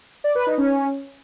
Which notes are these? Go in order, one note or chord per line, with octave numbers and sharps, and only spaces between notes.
D5
B4
D#4
C#4